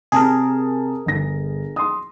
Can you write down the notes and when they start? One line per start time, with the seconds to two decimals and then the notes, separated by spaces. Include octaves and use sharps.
0.12 C3 G#4 A#4 A5
1.06 G1 A#6
1.76 C6 D#6